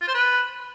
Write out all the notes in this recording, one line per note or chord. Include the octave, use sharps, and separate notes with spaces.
F4
C5
B4